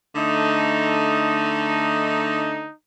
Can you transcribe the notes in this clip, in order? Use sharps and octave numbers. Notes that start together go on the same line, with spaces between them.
D3 A3 D#4